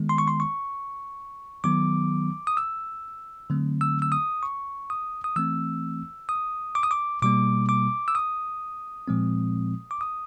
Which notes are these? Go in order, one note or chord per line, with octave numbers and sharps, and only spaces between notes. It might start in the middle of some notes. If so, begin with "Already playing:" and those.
Already playing: D#3 G#3 B3
C6
C#6
C6
C#6
D#3 F#3 B3 D6
D#6
E6
D3 F#3 A3 C4
E6
E6
D#6
C#6
D#6
D#6
E3 A3 C4 E6
D#6
D6
D#6
D6
B2 G3 A#3 D6
D6
E6
D#6
A#2 F3 G#3 C4
D6
D#6